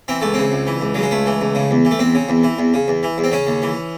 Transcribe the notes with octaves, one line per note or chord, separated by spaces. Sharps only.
E3 C4
C#2 A3
C#3 C4
C#2
E3
C#2
C#3 F#3
G#3
C#2 A3
E3
C#2
C#3
E2
E3
A3
E2 C4
C#3
E2
E3
E2
C#3
E2
E3
E2
C4
C#3 C#4
D#2
E3